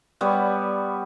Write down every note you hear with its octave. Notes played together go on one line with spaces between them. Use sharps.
G3 B3 C#5 D5